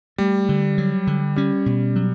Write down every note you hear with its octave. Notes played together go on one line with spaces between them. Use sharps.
G3 A3
D3
F#3
D3
G3 C#4
B2
F#3